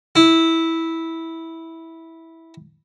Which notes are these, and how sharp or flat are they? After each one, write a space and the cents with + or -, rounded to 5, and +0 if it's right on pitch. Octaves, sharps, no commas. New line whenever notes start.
E4 -10